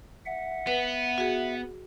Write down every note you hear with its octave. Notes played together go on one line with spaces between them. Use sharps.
E5 F#5
B3 B4
F#4 G#4